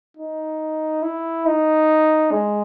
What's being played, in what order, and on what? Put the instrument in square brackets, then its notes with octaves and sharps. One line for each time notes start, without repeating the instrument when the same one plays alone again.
[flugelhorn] D#4
E4
D#4
G#3